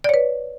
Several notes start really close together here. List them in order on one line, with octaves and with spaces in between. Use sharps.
D5 C#5 B4